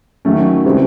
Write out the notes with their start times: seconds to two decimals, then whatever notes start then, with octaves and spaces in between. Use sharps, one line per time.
0.25 D#3 F#3 A3 C#4
0.65 C#3 E3 G3 C4